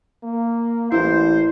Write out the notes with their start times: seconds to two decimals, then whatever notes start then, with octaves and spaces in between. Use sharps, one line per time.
0.23 A#3
0.92 A1 E4 C5